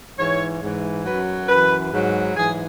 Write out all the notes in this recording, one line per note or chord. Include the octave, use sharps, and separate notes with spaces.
G#2 E3 C#5
G#2 E3
F#2 F#3 B4
F#2 E3 B4
G#2 F#3
G#2 E3 G#4